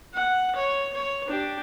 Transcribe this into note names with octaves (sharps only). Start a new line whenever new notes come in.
F#5
C#5
C#5
D4 G4